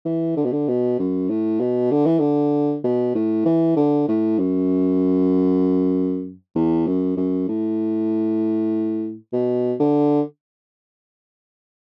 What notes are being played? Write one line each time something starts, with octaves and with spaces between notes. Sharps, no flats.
E3
D3
B2
D3
B2
F#2
A2
B2
D3
E3
D3
B2
A2
E3
D3
A2
F#2
E2
F#2
F#2
A2
B2
D3